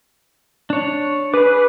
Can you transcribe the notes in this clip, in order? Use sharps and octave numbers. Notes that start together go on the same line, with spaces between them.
D4 C#5
G#4 B4 D6